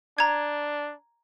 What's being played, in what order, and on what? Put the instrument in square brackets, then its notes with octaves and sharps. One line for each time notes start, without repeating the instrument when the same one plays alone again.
[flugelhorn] D4 [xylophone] A#5 G#6